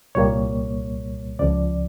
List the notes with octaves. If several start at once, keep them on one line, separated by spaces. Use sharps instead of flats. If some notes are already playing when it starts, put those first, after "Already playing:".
C2 A#2 G3 A#3 C#5
C#2 C#3 F3 D5